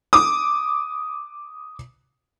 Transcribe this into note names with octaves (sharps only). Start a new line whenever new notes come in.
D6 D#6